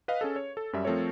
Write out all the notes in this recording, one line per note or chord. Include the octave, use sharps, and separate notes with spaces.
B4 D#5 F5
C#4 G#4 A4
C#5
A4
F#2 G3 E5
F3 A3 C4 A4 A#4 C#5